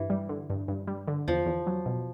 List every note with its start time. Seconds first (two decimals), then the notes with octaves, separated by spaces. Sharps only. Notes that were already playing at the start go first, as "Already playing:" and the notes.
Already playing: G2 E3
0.10 G3
0.29 D3
0.50 G2
0.68 G2
0.88 G3
1.08 D3
1.28 E2 F3
1.46 E2
1.67 F#3
1.86 B2